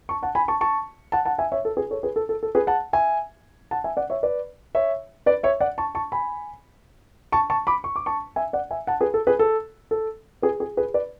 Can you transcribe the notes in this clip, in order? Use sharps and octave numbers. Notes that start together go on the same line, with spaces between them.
A5 C#6
F#5 A5
G#5 B5
A5 C#6
A5 C#6
F#5 A5
F#5 A5
E5 G#5
C#5 E5
A4
G#4 B4
A4 C#5
G#4 B4
A4
A4
A4
G#4 B4
F#5 A5
E5 G#5
F#5 A5
E5 G#5
D5 F#5
C#5 E5
B4 D5
C#5 E5
B4 D5
C#5 E5
D5 F#5
A5 C#6
A5 C#6
G#5 B5
A5 C#6
A5 C#6
B5 D6
C#6
D6
A5 C#6
E5 G#5
D5 F#5
E5 G#5
F#5 A5
G#4 B4
A4
G#4 B4
A4
A4
G#4 B4
G#4
G#4 B4
B4 D5